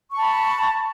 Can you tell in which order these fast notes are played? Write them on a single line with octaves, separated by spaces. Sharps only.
C#6 A5 B5